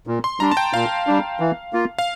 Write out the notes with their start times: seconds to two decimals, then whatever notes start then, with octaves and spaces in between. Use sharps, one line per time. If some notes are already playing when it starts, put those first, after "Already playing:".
0.07 A#2
0.24 C6
0.40 G3 D4 A#5
0.51 A5
0.57 G5
0.73 A#2 F5
1.07 G3 D4
1.40 E3
1.73 A#3 F4
1.99 F5